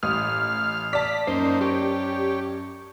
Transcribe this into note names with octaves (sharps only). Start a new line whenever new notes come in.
A1 F5 D#6 F6
D5 A5 B6
F#2 A#3 D#4 C5
G4 C#5